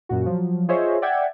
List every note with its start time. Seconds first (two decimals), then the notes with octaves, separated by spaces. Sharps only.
0.09 F#2 A#2 F#4
0.26 F3 F#3
0.68 F4 G#4 C5 C#5 D#5 E5
1.02 D5 E5 F#5 G5 G#6